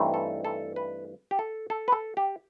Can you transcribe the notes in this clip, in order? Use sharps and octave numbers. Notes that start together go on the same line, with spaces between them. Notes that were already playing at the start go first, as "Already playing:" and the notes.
Already playing: G2 E3 A3 C4 D#4
A4
A4
B4
G4
A4
A4
B4
A4
G4